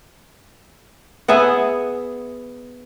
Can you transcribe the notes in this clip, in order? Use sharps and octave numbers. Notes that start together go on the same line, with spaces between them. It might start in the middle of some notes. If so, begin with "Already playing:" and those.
B3 G#4 E5 F#5